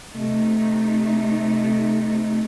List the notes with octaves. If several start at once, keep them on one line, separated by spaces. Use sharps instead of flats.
C3 A3 D#4